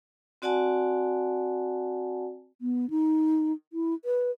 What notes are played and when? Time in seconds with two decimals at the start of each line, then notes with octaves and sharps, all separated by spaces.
0.42 C4 F#4 D5 F#5 G#5 A5
2.61 B3
2.90 D#4
3.73 E4
4.05 B4